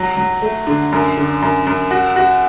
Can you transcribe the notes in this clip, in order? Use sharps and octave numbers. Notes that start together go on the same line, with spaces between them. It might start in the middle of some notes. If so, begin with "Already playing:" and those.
Already playing: F#3
F#3
A3
D3
F#2
D3
F#2
F#2
F#4
F#4